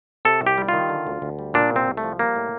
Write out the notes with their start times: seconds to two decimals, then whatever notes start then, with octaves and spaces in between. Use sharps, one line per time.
0.25 C3 A4
0.42 C2 G4
0.58 G3
0.69 F4
0.74 D#3
0.89 D3
1.07 D2
1.22 D2
1.39 G3
1.54 A#2 D4
1.71 C2 C4
1.88 C2
1.97 A3
2.04 F3
2.19 G3 A#3
2.36 A2